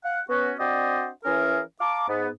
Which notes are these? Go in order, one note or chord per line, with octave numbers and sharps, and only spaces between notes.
F5 F#5
B3 C#4 F#4
C4 D4 F#4 C5 D5 D#5
E3 C#4 E4 G#4 A#4
F5 A5 A#5 D6
G#2 B3